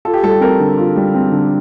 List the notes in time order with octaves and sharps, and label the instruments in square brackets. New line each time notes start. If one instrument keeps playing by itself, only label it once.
[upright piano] F4 [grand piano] A4
[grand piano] G4
[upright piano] G3 [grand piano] A4
[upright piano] C4 [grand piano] A#4
[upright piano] D3
F4
G3
C4
D3